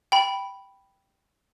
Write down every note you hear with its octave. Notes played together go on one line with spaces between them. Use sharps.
G5 B5